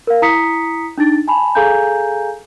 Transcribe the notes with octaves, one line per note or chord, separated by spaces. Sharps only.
A#4 F5
E4 A#5 D#6 B6 C#7
D4 D#4 A6
G#5 A5 B5
G#4 A4 F5 G#5 A#5 G6